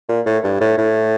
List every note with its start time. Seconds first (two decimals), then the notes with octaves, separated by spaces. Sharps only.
0.09 A#2
0.26 A2
0.44 G2
0.61 A2
0.78 A2